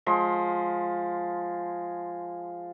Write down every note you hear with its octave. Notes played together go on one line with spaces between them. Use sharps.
F3 G#3 C6